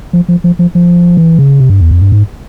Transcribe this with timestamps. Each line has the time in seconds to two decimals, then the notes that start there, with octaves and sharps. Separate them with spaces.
0.13 F3
0.28 F3
0.44 F3
0.59 F3
0.75 F3
1.17 E3
1.39 C#3
1.60 C3
1.70 G2
1.81 E2
1.91 F2
2.01 G2
2.12 G#2